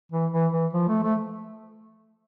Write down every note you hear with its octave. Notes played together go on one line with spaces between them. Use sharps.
E3
E3
E3
F3
A3
A3